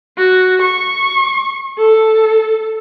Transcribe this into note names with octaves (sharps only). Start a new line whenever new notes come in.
F#4
C#6
A4